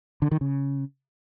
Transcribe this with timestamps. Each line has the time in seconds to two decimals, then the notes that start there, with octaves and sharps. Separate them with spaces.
0.22 D3
0.31 D#3
0.41 C#3